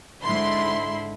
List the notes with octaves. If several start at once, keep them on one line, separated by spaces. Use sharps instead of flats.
G#2 D3 E4 B5 C6